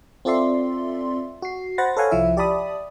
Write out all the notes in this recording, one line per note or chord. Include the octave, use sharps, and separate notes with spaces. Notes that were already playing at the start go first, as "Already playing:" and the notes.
C4 F4 A4 D5 E5 C6
F#4 C7
C5 F#5 B5 A6 A#6
A4 B4 C#5 F5 F#5 G#5
C2 F3 E4 E5
G4 D5 E5 A5 B5 D#6